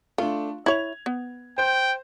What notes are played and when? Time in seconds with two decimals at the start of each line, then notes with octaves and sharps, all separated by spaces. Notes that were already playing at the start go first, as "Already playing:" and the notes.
0.18 A3 D4 F4
0.66 E4 C#5 G#6 F7
1.06 B3
1.58 C5 G5 G6